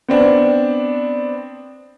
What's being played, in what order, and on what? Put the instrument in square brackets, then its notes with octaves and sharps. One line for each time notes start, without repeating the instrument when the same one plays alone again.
[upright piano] B3 C4 D4